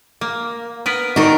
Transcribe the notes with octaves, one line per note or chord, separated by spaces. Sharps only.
A#3
B3 A#4 B4
D#3 D4 D#4 F#4 A#4